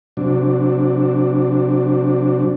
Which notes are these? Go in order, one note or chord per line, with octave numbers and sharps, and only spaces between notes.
C3 F#3 D4